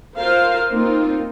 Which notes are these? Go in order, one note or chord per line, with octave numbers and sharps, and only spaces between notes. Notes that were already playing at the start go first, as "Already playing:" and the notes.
F4 A#4 C5 F5
A#3 C4 D#4 F4